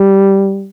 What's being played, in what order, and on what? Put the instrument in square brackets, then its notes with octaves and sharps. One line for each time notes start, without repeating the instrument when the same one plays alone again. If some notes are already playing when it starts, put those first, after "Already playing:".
Already playing: [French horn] G3